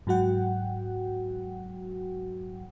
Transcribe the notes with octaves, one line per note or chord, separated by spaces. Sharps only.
G#2 F#3 F#4 F#5 G5